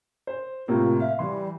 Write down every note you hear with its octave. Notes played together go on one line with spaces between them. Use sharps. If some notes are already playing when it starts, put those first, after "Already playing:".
C5
A2 C3 A#3 F4
E5 F5
E3 G3 C6